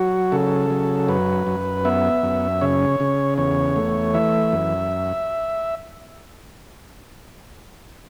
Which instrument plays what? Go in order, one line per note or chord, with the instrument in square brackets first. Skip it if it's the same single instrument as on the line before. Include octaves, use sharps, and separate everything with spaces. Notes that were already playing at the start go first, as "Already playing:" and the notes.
Already playing: [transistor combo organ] F#3 F#4
C#3 A4
F#3
F#2 B4
F#2
B3 E5
F#2
C#3 C#5
C#3
E2 C#5
A3
E3 E5
F#2